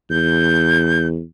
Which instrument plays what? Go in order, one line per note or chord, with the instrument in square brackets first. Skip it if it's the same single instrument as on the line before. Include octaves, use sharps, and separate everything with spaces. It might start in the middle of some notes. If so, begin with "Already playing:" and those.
[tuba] E2 [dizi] G6